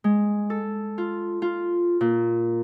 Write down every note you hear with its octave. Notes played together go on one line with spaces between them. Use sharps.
G#3
A4
F4
F4
A#2